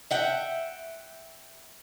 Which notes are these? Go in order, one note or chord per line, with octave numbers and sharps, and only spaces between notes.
E5 F#5 G5